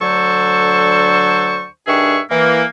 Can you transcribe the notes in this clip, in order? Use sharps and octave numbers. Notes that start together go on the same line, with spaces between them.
D2 D3 F#3 A4 C5 C#6
G2 D#3 D4 G#4 E5 C#6
E3 A#3